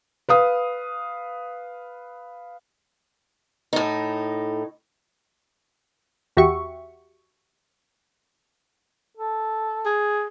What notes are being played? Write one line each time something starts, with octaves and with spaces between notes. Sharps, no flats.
B4 F5 D#6
A2 D#4
E2 F#4 G4 E5 C#6
A4
G#4